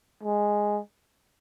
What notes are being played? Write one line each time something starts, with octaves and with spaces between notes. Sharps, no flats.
G#3